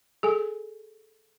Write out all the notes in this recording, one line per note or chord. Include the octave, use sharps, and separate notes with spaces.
G#4 A4 G#5